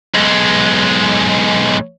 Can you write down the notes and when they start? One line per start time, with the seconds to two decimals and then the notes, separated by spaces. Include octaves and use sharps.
0.15 B1 G#3